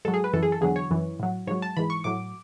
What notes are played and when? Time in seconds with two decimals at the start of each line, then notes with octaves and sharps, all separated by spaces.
0.05 G#2 F#3 A4
0.14 G#4
0.24 B4
0.33 F#2 E3 A4
0.43 G#4
0.52 A4
0.61 E2 D3 F#3 G#4
0.76 C#5
0.90 F#2 E3
1.19 A2 F#3
1.47 G#2 F#3 C#5
1.62 A5
1.77 G#2 E3 B5
1.90 C#6
2.04 A2 F#3 D6